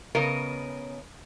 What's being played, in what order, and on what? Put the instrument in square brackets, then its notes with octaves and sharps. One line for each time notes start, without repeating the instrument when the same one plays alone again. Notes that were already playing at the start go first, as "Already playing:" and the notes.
[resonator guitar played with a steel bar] C#3 B3 A#4 D#5